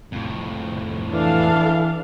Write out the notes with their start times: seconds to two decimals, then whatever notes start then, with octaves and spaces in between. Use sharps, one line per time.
0.12 F2 A2
1.11 E3 D4 A4 F5